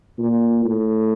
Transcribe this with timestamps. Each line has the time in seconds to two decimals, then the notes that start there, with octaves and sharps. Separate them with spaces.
0.19 A#2
0.64 A2